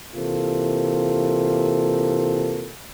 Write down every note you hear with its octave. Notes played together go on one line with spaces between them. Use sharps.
C3 E3 A#3 F4 A4